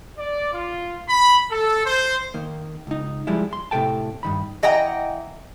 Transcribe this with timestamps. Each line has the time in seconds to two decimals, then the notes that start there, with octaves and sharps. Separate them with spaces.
0.18 D5
0.53 F4
1.08 B5
1.50 A4
1.85 C5
2.34 D#3 A#3
2.87 C#2 D#4
3.27 F3 G3 G#3 E4
3.53 C6
3.71 A2 C3 A#3 A4 G5 A5
4.23 G2 D#3 B5
4.63 E3 D#5 F#5 G5 A#5